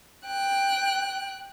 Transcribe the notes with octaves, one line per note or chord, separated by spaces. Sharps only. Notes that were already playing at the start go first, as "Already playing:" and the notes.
G5 F#6